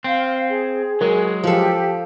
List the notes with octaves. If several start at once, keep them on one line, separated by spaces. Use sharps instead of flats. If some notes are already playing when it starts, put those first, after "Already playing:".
C4 F5
G#4
F#3 G#3 A#4
F3 G4 A4